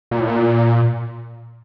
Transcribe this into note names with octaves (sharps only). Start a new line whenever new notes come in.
A#2
A2
A#2